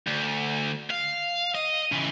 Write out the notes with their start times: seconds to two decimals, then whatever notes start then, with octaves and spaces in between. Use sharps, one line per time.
0.07 D2
0.90 F5
1.55 D#5
1.92 C#3 E3